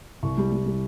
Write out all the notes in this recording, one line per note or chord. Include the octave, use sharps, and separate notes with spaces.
C2 C#6
G3
G3
G3